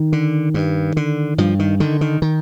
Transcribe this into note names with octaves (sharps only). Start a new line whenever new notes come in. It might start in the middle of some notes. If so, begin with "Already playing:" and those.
Already playing: D#3
D3
G2
D3
G2 F3
D#3
D3 D#3
D#3
D#3